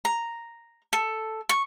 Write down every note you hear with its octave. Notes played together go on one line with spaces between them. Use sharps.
A#5
A4
C#6